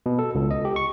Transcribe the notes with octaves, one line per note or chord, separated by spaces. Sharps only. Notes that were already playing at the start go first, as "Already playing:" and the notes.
B2
A4
C#2
D#5
G4
C#6